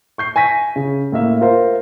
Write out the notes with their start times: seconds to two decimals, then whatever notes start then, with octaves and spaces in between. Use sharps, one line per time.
0.18 C#6 G6 C7
0.36 G#5 C#6 A#6 B6 D#7
0.76 C#3
1.12 A2 A#3 E5
1.41 F4 A#4 C5 E5